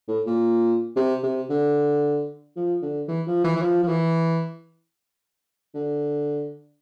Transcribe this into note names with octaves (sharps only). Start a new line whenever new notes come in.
A2
A#2
C3
C3
D3
F3
D3
E3
F3
E3
E3
F3
F3
E3
D3